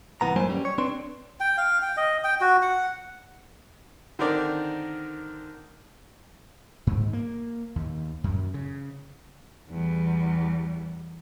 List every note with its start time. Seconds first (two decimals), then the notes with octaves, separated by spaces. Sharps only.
0.21 C2 E3 B3 A#5
0.36 G2 F#3 A#3 D4 C5 G#5
0.49 G3 C#4
0.65 C#5
0.78 C4 D4 B4 C6
1.40 G5
1.58 F5
1.82 G5
1.97 D#5
2.24 G5
2.41 F#4
2.62 F#5
4.19 D3 D#3 C4 A#4 D5
6.87 G#2
7.13 A#3
7.76 D#2
8.24 F#2
8.54 C#3
9.71 E2 G3